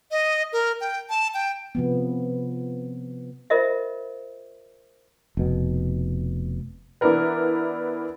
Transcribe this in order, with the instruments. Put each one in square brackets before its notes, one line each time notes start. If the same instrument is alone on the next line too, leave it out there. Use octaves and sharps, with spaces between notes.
[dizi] D#5
A#4
G5
A5
G5
[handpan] C3 F3 B3
[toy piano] F4 A#4 C5 D#5 E5
[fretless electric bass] F1 B2
[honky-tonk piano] E3 B3 D4 E4 A#4 B4